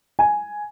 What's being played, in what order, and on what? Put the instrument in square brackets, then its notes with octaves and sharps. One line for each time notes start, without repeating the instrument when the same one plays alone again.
[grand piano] G#5